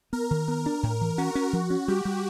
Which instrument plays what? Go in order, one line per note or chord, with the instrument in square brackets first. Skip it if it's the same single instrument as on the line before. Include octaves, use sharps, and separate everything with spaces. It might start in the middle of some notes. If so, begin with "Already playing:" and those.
[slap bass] B3 [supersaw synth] A#4
[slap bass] D#3
B3
D4
A2
E3
[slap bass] C#4 [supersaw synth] F#4
[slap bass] C#4
F3
C#4
[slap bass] G3 [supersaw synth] G4
[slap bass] G3